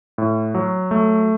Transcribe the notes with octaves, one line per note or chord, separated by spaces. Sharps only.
A2
F#3
A3